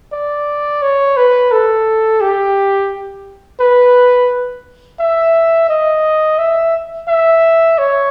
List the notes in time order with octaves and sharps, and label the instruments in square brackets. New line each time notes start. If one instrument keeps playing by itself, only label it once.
[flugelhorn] D5
C#5
B4
A4
G4
B4
E5
D#5
E5
E5
C#5